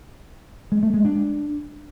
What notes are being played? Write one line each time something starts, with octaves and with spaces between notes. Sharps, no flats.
G#3
A3
G#3
D4